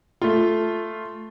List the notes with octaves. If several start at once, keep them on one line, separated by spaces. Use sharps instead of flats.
A3 F4